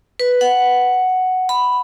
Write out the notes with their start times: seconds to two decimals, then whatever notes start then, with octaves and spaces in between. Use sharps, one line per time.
0.20 B4
0.41 F#5
1.49 B5